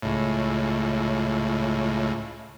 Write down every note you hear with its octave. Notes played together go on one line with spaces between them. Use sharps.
C#2 A2